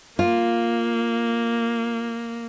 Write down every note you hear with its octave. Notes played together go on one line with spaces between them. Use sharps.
A#3 F4